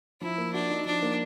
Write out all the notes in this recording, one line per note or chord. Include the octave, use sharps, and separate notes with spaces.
F3 E4
A#3
D4 F#4
D#4
F3 D4
A#3